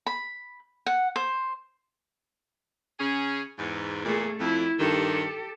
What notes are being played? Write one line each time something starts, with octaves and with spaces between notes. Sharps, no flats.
B5
F#5
C5
C#3 C#4 G#4
E2 G#2
E2 A#2 A3 G#4
F2 E4
G2 D#3 G4 A4